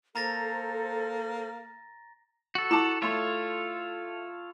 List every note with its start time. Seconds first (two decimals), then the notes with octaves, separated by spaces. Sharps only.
0.15 A#3 A4 C5 A#5 A6 A#6
2.55 F#4 A4
2.71 E4 A5 D6 E7
3.02 A3 F4 A4 C#5 C6